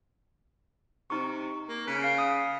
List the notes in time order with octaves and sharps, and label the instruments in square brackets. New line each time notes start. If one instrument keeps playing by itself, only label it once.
[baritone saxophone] C3 [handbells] D#4 C#6
[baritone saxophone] A#3
[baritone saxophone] C#3 [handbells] F#6 B6
[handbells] F5 C7
D#6